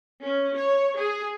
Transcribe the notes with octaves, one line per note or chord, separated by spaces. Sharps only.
C#4
C#5
G#4